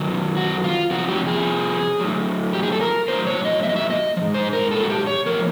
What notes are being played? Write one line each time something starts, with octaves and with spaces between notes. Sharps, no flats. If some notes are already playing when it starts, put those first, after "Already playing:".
Already playing: F#2 D#3 F#3
F#4
F4
F2 C3 F3 F#4
G4
G#4
A2 F#3
G4
G#4
A4
A#4
A2 F#3 C5
C#5
D#5
E5
D#5
E5
D#5
F3
G#2
C5
A#4
A4
F#4
G4
C#5
A2 F3 A#4